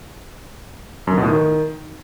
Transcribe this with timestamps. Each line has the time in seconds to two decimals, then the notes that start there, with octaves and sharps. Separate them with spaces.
1.07 F#2
1.12 D3
1.18 B2
1.23 A2
1.28 D#3